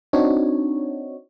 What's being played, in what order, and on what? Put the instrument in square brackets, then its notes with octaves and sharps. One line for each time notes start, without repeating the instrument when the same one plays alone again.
[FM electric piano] C4 D4 D#4 F#4 C#5